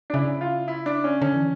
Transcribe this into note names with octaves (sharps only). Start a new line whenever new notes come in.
D4
C#3 E4
F4
E4
D4
C#4
D3 C#4
E3